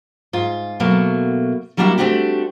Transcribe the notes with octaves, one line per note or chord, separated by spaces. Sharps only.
G#2 F4
B2 F#3 A3 A#3
F#3 G3 A#3 D4 E4 F#4
A3 C4 D4 F#4 G4